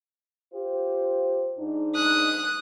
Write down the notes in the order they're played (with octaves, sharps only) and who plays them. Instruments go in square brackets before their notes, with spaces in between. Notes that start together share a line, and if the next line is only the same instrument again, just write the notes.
[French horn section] F4 G4 C5
G#2 D4 D#4
[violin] D#6 F#6